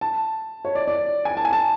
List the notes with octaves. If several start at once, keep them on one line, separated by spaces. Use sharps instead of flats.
A5
C#5
D5
D5
G#5
A5
G#5
A5